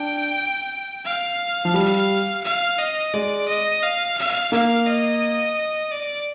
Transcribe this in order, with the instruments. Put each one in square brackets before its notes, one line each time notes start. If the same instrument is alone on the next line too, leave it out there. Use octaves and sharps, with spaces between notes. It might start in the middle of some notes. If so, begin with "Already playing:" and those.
Already playing: [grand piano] D4 [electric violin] G5
[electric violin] F5
[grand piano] F3
G3
[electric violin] F5
D#5
[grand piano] G#3 [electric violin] D5
[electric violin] D#5
F5
F5
[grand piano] A#3 [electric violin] F5
[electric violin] D#5
D5